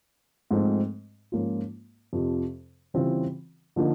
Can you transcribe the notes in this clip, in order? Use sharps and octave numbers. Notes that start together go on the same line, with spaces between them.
G#2 F3 A3 C4 D#4
G#2 F3 A#3 C#4 F4
F2 C3 F3
C#3 E3 G3 C4 F4
D3 F3 A#3 D#4